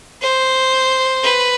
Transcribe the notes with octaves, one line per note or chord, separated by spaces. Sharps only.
C5
B4